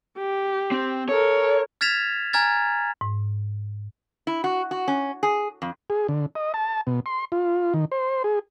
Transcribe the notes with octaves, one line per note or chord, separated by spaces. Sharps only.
G4
C4
A4 A#4 C#5
F6 G#6 A6 B6 E7 F7
G#5 A#5 F6 G#6 A6
G#2
E4
F#4
F#4
C#4
G#4
F2
G#4
D3
D#5
A5
B2
C6
F4
D#3
C5
G#4